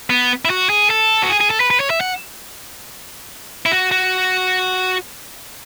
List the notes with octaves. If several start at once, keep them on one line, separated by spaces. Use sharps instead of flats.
B3
E4
F#4
G#4
A4
F#4
G#4
G#4
A4
B4
B4
C#5
E5
F#5
E4
F#4
F#4